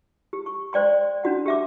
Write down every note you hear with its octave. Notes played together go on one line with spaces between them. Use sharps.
G4
C#6
C5 D5 G5 C6
C#4 D4 F#4 F#5
G4 E5 D6